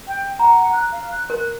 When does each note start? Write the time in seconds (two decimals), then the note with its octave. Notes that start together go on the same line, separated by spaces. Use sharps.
0.07 G5
0.39 F#5 A#5
0.73 F#6
0.91 F5
1.11 F#6
1.30 A#4